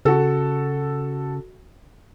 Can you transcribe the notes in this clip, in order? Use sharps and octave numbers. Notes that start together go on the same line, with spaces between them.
C#3 F#4 A4